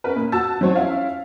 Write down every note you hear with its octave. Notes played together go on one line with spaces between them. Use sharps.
C#4 A#4 B4
A#2
F#4 A5 E6 A6
F#3 C4 C5 C#5
C#4 E4 F5